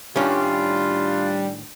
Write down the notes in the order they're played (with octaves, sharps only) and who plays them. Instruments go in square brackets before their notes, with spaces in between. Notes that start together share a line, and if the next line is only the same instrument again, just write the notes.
[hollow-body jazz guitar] A2 D#3 C#4 [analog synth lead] G3 [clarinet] D4 [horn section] F4